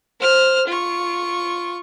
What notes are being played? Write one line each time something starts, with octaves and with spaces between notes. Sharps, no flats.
C5 F6
F4 C#6